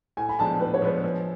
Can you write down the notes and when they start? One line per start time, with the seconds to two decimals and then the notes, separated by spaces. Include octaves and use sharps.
0.17 A2 G#5
0.29 B5
0.39 F3 G#3 B3 D4 A5
0.60 A2 B4
0.74 C#5
0.82 F3 G#3 B3 D4 B4
1.04 F3